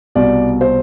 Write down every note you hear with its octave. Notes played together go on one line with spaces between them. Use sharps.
C2 B2 D5
C5